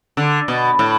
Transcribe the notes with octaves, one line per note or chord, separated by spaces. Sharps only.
D3
B2
A2